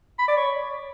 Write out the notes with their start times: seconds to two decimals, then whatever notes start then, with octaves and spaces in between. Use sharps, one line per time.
0.19 B5
0.28 D5
0.37 C#5